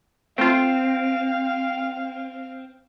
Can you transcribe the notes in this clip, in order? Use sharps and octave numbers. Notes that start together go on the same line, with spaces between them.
A3 C4 F4 F5